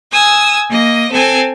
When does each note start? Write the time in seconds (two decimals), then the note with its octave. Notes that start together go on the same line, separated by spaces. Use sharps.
0.12 G#5 D#6 E6
0.69 A#3 D#5
1.11 C4 A4 G#5